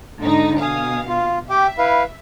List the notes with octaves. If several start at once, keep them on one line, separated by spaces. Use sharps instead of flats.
G#2 D3 D#4
B2 F5 G#5 D#6
F4
G4 E5 G5 D6
E4 B4 F5